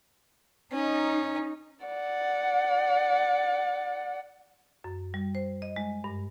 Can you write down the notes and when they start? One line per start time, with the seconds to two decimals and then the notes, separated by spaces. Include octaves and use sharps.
0.72 C#4 D#4
1.85 D5 F#5
4.84 F#2
5.14 G3
5.35 C5
5.62 D#5
5.76 G#3
6.04 G2